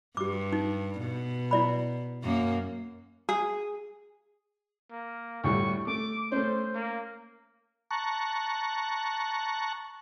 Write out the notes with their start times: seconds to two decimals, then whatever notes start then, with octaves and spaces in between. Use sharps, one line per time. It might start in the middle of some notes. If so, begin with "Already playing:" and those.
0.17 G2 G4 D6
0.52 D#4
0.99 B2
1.51 E4 D5 B5
2.23 F#2 A#3
3.29 G#4
4.91 A#3
5.44 D2 A2 G3 C#6
5.87 A3 D6
6.32 A3 C#4 C5
6.75 A#3
7.91 A5 A#5 C#6 F#6